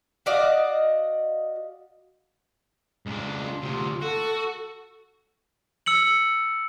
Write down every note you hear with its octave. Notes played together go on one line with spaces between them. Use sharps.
F#4 D5 D#5 F5
C#2 D4
F4
D2 C3
F#4 A4
E6 C#7 F#7